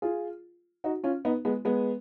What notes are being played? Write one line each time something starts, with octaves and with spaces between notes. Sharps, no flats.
F4 G#4
D#4 F#4
C#4 F4
B3 D#4
G#3 B3
G#3 B3